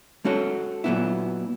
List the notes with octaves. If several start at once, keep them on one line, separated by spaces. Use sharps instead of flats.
G#3 C#4 F#4 A4 C#5
A#2 F#3 B3 E4